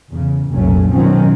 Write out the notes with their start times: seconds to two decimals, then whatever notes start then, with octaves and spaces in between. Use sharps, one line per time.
0.13 E2 C#3
0.52 F1 B1 A#2 F#3 A3 C#4
0.90 B2 D#3 F3 F#3 C4 C#4